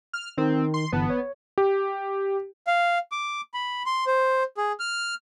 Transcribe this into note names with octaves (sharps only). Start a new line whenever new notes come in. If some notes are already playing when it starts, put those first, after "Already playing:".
F6
D#3 C4 D#4
C6
G1 E3 B3 A5
C#5
G4
F5
D6
B5
C6
C5
G#4
F6